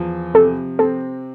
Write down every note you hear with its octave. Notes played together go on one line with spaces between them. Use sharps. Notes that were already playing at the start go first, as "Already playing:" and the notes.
Already playing: E2 F3
C3 A4
C4 A4